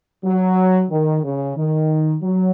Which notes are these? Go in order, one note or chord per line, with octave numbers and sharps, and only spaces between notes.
F#3
D#3
C#3
D#3
F#3